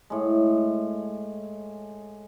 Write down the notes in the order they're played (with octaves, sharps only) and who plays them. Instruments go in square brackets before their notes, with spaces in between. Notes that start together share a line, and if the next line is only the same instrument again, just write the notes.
[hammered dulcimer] A2 G#3